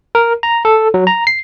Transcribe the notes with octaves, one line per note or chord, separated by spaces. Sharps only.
A#4
A#5
A4
F#3
A#5
C7